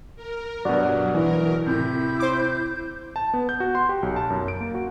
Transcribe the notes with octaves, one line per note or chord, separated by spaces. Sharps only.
A#4
G2 B2 F#3 F#4 D5
E3 A#4
A2 C3 E4 G6
C5 D6
A5
B3
G6
F#4
C6
G4
B1
A5
F#2
D7
A#3
F#4